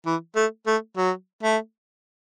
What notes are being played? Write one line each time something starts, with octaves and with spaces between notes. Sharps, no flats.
E3
A3
A3
F#3
A3